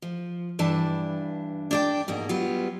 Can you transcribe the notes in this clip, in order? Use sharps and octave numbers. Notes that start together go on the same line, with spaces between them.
F3
G2 E3 D4 A5
D4 D5 G5
G#2 B2 A#3
F#3 G3 B3 F4